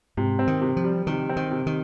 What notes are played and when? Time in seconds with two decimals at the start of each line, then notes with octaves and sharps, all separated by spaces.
0.17 G#2 C3
0.39 C4
0.47 D#3
0.62 C3
0.77 F3
0.84 G3
1.07 C3 D#3
1.29 C4
1.36 D#3
1.51 C3
1.66 D#3